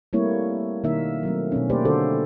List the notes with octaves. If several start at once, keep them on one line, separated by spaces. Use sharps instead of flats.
G3 A3 A#3 C4 E4 C#5
B2 D#3 A#3 D#4 A#4 E5
F#3 A3 C4
B2 C4 C#4
A3 A#3 G4 B4 C5 D5
D3 F#4 A4 C5